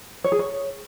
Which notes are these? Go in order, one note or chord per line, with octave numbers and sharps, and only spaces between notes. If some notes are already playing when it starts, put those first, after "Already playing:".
C#5
G#4
C#5